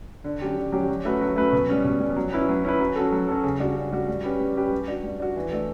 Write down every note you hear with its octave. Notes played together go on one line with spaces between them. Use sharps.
D3
F#3 C#4 G4
D3
F#3 C#4 G4
F#3
A3 C#4 F#4 B4
F#3
A3 C#4 F#4 B4
B2
G3 C#4
B2
G3 C#4
F#3
C#4 E4 B4
F#3
C#4 E4 B4
F#3
C#4 F#4 A4
F#3
C#4 F#4 A4
C#3
G3 D4 F#4
C#3
G3 D4 F#4
G3
C#4 G4 B4
G3
C#4 G4 B4
G3
D4 F#4
G3
D4 F#4
E3
A3 D4